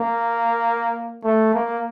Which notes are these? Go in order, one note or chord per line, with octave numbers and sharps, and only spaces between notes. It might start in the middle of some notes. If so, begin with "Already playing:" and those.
Already playing: A#3
A3
A#3